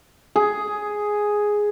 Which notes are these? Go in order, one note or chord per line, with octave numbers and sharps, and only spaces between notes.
G#4